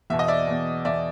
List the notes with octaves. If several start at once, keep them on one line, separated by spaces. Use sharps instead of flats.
E2 B2 E5
D#5
D5 E5
E2 B2
E2 B2 D5 E5